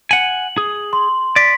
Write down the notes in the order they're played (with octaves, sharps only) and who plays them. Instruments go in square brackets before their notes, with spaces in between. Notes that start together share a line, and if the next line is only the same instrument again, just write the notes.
[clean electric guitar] F#5 G#5 [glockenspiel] F#7
[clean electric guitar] G#4
[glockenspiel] C6
[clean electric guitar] D5 [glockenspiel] B6